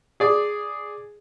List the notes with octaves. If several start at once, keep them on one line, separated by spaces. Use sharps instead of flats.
G#4 D5